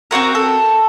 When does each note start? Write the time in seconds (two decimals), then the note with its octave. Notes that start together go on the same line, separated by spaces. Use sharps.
0.11 C4 D4 F#4 A#4
0.35 A4